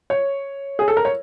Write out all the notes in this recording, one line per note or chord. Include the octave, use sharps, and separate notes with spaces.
C#5
G#4
A4
A#4
C#5